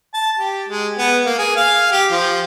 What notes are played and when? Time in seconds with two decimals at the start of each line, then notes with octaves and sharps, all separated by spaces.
0.14 A5
0.39 G4
0.69 G#3
0.98 B3
1.26 A#3
1.38 G#4
1.56 F5
1.92 G4
2.12 F3